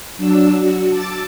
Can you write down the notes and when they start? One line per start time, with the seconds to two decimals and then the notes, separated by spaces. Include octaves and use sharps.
0.17 F#3 D4 E6
0.57 F#4
0.89 A5 D6 E6 A6